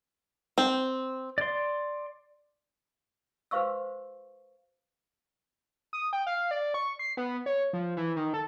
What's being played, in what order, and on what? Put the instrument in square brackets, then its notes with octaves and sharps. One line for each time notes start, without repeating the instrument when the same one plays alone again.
[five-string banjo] C4
[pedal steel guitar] D5 C6
[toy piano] F#4 B4 C5 F5 C#6 E6
[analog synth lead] D#6
G5
F5
D5
C#6
C7
B3
C#5
F3
E3
D#3
A4